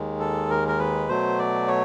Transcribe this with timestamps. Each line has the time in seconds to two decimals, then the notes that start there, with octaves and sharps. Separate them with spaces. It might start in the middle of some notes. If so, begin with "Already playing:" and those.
Already playing: D#2 D#3 G#3
0.20 A4
0.50 A#4
0.68 A#4
0.79 B4
1.08 B2 F#3 A3 C5
1.39 D5
1.68 C#5